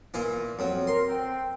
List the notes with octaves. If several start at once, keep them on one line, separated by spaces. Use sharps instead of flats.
A#2 E3 E4
F2 F#3
A#4 C6
C4 G5